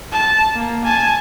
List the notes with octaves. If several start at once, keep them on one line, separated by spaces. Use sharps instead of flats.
A5
A#3
G#5 A5